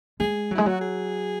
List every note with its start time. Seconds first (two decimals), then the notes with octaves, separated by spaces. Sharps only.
0.20 G#3 G#4
0.51 F#3
0.55 G#3 E4
0.66 F#3 F#4
0.81 G#4